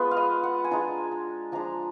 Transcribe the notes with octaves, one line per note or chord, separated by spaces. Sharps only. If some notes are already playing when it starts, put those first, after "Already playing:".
Already playing: G#3 B3 F4 B4
F5
D#5
F#5
G#5
G#3 D4 F4 A#5
A#5
F3 G#3 D4 A#5